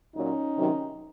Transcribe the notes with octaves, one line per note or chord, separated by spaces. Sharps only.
A#2 F#3 C#4 D#4
C3 D#3 F#3